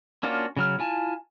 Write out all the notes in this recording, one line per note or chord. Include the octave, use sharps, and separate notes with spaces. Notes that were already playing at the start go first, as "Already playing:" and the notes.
A#3 C#4 D4 F4 F#4
C#3 F#3 F6
E4 F4 G#5 A5